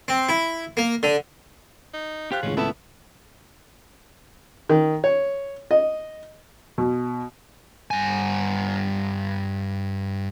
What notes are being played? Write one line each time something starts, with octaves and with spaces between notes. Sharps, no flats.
C4
E4
A#3
D3
D#4
F3 F4 G4 F#6
C#2 A2 D#3 C#4 G#4
D#2 A3 B3 E4 A5
D#3
C#5
D#5
B2
G2 G#5